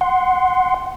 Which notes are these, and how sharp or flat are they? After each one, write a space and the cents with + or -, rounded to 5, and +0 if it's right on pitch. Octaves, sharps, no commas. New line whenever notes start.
F#5 +0 C6 +0